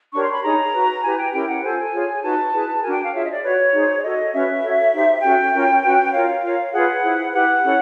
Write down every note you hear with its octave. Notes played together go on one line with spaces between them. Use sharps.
D4 G4 A#4 C#5 C#6
C6
B5
D#4 G#4 C#5 A#5
F#4 B4
E4 G4 B4 G#5
G5
C#4 E4 G4 A#4 G5
F#5
F4 A4 C5 G#5
F4 G#4 C#5
D#4 F#4 B4 A5
E4 G#4 B4
D4 F#4 A#4 G#5
G5
F5
F4 G#4 C#5 E5
D#5
D5
F#4 B4 C#5
D#4 G#4 C5
D5
F#4 A4 C#5 D#5
C#4 F#4 B4 E5
F#4 A4 C#5
D#4 G4 C5
C#4 F#4 A4 G5
C#4 F4 A#4 C#5
C#4 F#4 B4
F4 A#4 C#5 F5
F4 A#4 C#5
F4 G#4 B4 F#5
E4 G#4 C5
E4 G4 B4 F#5
C#4 E4 A4 C#5